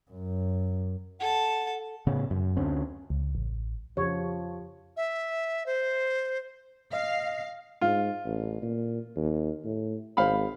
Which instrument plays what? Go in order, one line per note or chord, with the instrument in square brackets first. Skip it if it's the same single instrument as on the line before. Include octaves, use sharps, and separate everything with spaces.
[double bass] F#2
[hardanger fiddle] A4 A5 [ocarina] F#5
[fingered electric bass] A2 C#3 B3 C#4
F#2
D2 D3 C4 C#4
[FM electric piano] C#2
A1
[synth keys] F2 [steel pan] C#3 C#5 [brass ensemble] F3 [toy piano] G4
[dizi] E5
C5
[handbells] D#5 [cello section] F5
[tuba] G#2 [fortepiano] F4
[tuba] A1
A#2
D#2
A2
[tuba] G#1 [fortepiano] C5 F5 B5